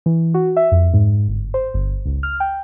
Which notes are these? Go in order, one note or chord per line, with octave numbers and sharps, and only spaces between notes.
E3
F#4
E5
F2
G#2
G1
C5
G1
C#2
F6
G5